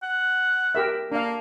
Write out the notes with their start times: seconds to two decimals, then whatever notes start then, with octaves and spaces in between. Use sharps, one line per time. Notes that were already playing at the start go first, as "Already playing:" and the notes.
0.03 F#5
0.75 G4 A#4 E5
1.12 A#3 D4 F5